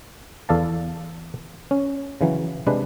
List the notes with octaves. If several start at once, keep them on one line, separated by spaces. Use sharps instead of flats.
E2 A4 D5 F5 A5
C#4
C#3 E3 F#3
C3 G#3 D4 B4